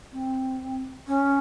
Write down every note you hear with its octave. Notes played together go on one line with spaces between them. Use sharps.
C4
C#4